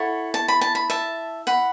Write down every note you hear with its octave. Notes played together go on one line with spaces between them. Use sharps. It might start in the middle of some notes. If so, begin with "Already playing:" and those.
Already playing: E4 A4 C#5 F#5
A5
B5
A5
B5
E5 A5
F#5 B5